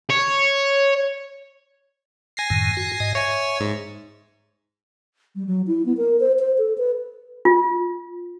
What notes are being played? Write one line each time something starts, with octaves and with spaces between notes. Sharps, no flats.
C#5
G#5 A#6 C7
F#2 A2 D#3
F#4
G#2 D#5
C#5 E5 G#5
G#2
G3
F#3
E4
B3
A#4
C5
C5
A4
B4
F4